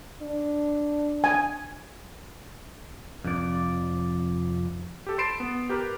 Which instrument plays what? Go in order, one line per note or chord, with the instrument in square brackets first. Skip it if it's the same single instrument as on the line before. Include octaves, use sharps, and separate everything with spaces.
[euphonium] D4
[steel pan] G#5
[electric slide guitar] F2 C3 D5
[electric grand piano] G4 A4
B5 C6 A6 C7 D7 E7
B3
G4 A#4 B4